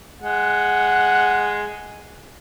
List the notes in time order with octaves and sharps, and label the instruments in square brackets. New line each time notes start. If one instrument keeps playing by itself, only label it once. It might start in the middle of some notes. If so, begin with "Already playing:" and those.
[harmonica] G#3 F#5